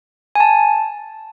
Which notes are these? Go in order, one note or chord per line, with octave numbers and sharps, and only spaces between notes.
G#5
A5